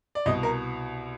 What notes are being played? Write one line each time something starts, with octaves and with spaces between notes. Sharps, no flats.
D5
C2 B2 D#5
A#4